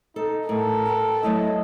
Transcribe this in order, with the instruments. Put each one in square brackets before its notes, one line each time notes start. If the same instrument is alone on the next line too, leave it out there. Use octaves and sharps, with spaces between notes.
[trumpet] D#4 [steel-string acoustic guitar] A4
[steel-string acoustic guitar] A2 [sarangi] A4 [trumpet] A#4
[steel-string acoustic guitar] B4 G5
[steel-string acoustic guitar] F#3 A3 E4 [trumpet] D#5